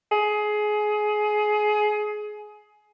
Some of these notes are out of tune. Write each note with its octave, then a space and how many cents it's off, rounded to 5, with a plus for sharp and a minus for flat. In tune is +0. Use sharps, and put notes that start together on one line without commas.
G#4 +20